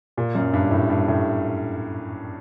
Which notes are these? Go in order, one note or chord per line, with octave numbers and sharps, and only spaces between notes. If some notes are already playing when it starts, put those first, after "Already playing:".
A#2
F#2
G2
A2
G2
A2